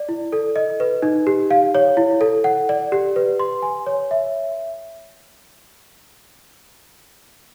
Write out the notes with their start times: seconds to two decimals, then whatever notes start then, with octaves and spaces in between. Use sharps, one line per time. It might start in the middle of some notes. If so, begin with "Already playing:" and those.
Already playing: D5
0.09 E4
0.33 A4
0.56 D#5
0.80 B4
1.02 D#4
1.27 G4
1.51 F5
1.75 C#5
1.97 E4
2.21 A4
2.44 F#5
2.69 D5
2.92 G4
3.16 B4
3.40 C6
3.62 G#5
3.87 C#5
4.11 E5